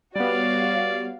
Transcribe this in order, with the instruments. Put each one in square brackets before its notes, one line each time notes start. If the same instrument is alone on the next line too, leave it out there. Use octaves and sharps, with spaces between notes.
[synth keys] G3 B3 [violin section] F#4 C#5 F5 [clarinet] D5